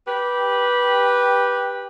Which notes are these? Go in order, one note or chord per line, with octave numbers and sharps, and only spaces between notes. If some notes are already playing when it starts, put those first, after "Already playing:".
G4 B4